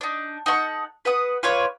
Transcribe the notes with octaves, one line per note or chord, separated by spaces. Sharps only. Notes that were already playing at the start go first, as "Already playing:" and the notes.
D4 D#4
D#4 A4 F#5 C#6
B4 F#5 D#6
F4 B4 C#5 D5